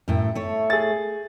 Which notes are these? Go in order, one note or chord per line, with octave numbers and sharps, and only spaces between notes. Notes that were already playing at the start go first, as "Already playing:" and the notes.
F#2 A2 G5
A3 A4 C#5
G#4 A6